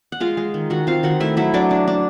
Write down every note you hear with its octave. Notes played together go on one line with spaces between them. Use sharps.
F#5
G#3 F4 F5
G#3
D#3
D#3 F#4 F#5
C4 F4 F5
D#3 F#4 F#5
A3 E4 E5
F#3 E4 E5
F#3 D4 D5
D4
D4